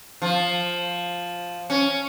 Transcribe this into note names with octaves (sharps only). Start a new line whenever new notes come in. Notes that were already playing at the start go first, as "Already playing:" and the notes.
F3
C#4